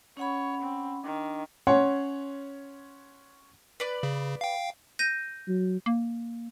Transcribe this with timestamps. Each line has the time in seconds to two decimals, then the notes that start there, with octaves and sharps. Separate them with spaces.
0.17 C#4 C#5 F#5 B5
0.62 C4
1.04 D#3 D4
1.67 C#4 C#5 F#5 C6
3.80 B4 D5
4.03 C#3
4.41 F5 G5
4.99 G6 A#6 D#7
5.48 F#3
5.86 A#3